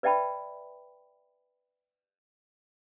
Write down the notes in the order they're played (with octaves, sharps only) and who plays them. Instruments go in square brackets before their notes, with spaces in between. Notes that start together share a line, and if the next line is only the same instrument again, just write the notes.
[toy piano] B4 D5 E5 G5 A5 B5